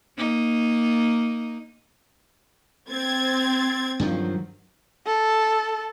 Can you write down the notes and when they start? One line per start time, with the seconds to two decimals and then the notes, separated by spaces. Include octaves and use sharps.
0.17 A#3 D#4
2.90 C4 G#6 A6
4.00 G2 D#3 F3 F#3
5.06 A4